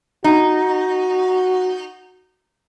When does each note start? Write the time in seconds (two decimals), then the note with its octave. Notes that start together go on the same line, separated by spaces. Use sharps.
0.24 D#4 F#4